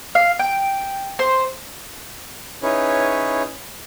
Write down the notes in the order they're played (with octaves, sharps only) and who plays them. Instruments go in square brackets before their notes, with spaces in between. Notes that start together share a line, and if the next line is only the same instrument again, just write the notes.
[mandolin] F5
G5
C5
[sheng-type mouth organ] C#4 D#4 E4 G#4 B4 C#5